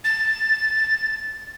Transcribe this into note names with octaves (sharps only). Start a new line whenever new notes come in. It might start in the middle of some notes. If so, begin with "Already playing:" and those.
A6